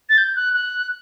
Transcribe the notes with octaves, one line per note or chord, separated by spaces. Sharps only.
A6
G6
F#6
F#6